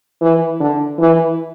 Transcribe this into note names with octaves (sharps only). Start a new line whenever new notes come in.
E3
D3
E3